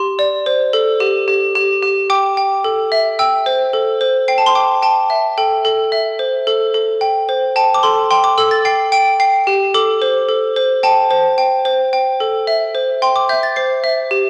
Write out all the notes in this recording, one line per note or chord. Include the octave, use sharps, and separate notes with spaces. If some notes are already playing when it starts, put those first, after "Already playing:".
Already playing: G4 C6
D5
C5
A4
G4
G4
G4
G4
G5 D6
G5
A4
E5
G5 E6
C5
A4
C5
G5 C7
A5
C6
G5 D6
G5 A5
E5
A4 G5
A4
E5
C5
A4
A4
G5
C5
G5 A5
D6
A4 C6
G5 C6
D6
A4 E6
A6
G5 C7
G5 D7
G5 C7
G4
A4 D6
C5
A4
C5
G5 A5
C5
G5
C5
G5
A4
E5
C5
G5 C6
D6
E5 G6
A6
C5 C7
E5
G4